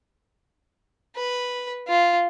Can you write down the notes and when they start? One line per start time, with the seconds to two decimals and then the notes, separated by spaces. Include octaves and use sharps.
1.16 B4
1.88 F4